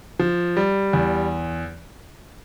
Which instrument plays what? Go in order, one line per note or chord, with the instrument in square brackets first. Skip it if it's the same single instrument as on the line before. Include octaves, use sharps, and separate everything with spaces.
[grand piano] F3
G3
E2